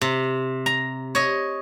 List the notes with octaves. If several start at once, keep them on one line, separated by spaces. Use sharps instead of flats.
C3
A#5
C#5 D#5